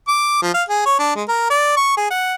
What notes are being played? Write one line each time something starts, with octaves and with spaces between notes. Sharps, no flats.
D6
F3
F5
G#4
C#5
D4
G#3
A#4
D5
C#6
G#4
F#5